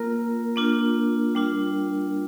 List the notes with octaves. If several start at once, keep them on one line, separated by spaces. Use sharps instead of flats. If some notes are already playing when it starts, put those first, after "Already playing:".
Already playing: A#3 F4 A#4
A#3 D4 F4
G3 D4 F4